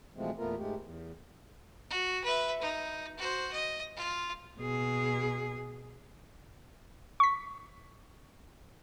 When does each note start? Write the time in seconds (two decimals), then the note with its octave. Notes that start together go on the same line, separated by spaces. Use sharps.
0.16 B2 E3 F3 G#3 A3 C4
0.38 E2 A#2 A3 B3 F4 A#4
0.57 G#2 G#3 A3 G4
0.79 E2
1.90 F#4
2.24 B4 E5
2.61 D#4
3.18 F#4 C5
3.53 D#5
3.96 F4
4.60 B2 G#4
7.20 C#6 B6